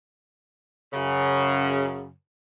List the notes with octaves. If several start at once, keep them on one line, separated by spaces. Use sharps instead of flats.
F#2 C#3